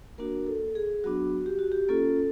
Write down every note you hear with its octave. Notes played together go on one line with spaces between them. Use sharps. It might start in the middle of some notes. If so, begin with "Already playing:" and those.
A#3 D4 F#4 A#4
A4
G#4
F#3 B3 D4 F#4
G4
F#4
G4
A#3 C#4 F4 A4